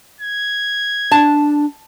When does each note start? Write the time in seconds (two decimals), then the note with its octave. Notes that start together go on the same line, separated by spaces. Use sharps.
0.21 G#6
1.11 D4 A5